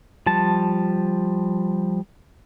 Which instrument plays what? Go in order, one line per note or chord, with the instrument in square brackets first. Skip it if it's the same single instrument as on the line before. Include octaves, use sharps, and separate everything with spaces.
[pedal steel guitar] F3 G3 A5